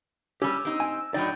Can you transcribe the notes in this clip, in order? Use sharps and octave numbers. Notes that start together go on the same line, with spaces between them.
G3 C#4 G4 E6
C4 D#4
G#5
A2 F#3 D#4 D5 G5